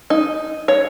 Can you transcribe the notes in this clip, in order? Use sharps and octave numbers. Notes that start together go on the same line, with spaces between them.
D#4
C#5